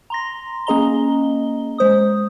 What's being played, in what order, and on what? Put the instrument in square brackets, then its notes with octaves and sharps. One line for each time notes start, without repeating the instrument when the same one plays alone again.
[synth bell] A#5 C6 A#6
A#3 C#4 G#4 D#5 A#5 G7
G#3 C5 D#6